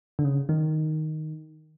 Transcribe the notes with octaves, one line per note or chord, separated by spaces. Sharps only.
D3
C#3
D#3